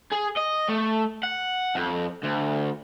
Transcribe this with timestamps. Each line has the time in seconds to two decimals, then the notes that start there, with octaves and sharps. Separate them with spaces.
0.12 G#4
0.36 D#5
0.69 A3
1.23 F#5
1.75 F2
2.23 D2